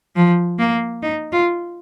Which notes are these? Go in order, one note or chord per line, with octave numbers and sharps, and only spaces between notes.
F3
A#3
D#4
F4